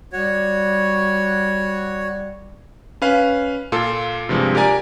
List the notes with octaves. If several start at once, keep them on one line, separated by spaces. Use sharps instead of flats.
G3 F#4 C#5
C#4 B4 F5
A#2 F4 A4
G2 C3 F3 G#3
G4 A#4 D5 G#5 A#5